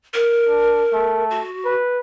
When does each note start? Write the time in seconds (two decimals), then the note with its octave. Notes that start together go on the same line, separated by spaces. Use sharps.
0.14 A#4
0.48 D4
0.93 A3
1.30 F#4
1.65 B4